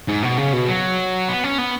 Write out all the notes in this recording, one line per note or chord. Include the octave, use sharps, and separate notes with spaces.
G#2
B2
C#3
B2
F#3
B3
C#4
B3